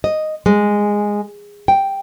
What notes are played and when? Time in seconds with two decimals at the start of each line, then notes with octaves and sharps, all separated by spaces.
0.04 D#5
0.46 G#3
1.68 G5